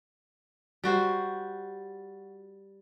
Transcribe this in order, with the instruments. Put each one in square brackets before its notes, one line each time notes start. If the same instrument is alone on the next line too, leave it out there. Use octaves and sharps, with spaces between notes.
[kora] G3 F#4 C5